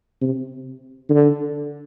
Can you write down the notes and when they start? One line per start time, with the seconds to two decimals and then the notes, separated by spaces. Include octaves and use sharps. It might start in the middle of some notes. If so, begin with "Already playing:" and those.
0.21 C3
1.09 D3